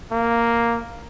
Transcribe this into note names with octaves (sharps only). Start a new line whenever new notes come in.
A#3